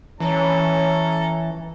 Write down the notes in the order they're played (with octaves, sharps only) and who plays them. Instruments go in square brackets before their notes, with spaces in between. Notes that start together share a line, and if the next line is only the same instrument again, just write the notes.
[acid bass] E3 [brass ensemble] C#4 [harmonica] A4 A#5